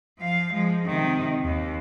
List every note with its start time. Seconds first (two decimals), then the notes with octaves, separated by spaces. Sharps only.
0.18 F3 F5
0.52 F3 G#3
0.86 C3 D#3
1.44 D#2